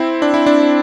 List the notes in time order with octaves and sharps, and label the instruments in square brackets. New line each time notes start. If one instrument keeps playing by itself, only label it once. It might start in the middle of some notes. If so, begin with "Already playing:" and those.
Already playing: [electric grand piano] C4 E4
D4
E4
D4